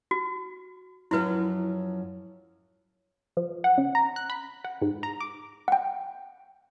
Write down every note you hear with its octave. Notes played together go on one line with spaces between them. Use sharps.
F#4
F#2 F3 F#3 E4 F#4 B4
F3
F#5
C#3
A#5
F#6
B5
F#5
G#2
A#5
D6
F#5 G5